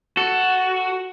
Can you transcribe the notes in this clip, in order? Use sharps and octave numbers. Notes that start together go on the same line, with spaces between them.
F#4 A4